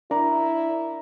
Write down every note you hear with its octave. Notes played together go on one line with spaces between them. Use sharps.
D4 E4 A#4 D5 A#5